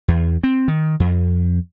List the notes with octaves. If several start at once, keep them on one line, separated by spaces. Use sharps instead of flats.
E2
C4
D#3
F2